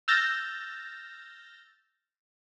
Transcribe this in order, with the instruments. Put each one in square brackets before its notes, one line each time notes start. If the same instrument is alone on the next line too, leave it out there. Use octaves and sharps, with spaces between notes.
[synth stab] E6 F6 G6 A6 A#6